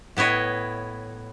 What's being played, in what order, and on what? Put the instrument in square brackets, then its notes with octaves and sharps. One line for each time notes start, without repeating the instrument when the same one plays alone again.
[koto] A2 B3 E4 C#5 D#5